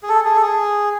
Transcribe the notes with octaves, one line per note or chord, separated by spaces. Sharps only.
G#4
A4
G#4
A4
G#4